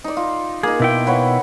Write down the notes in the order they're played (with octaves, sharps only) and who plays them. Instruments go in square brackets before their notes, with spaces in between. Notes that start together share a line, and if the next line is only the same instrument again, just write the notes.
[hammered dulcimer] D#4 D5
F4
[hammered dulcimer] A#3 D#4 [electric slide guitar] G#4
[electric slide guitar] B2 E4 G5
[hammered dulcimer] B4 C#5 F#5